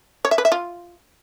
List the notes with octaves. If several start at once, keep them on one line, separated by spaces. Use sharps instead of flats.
C#5
E5
B4
E5
F4